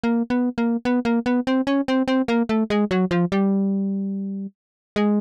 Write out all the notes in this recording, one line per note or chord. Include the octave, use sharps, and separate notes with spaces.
A#3
B3
A#3
B3
A#3
B3
C4
C#4
C4
C4
A#3
A3
G#3
F#3
F3
G3
G#3